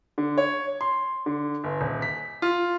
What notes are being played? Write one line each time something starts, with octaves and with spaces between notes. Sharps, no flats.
D3
C#5
C6
D3
G1
D#1
B6
F4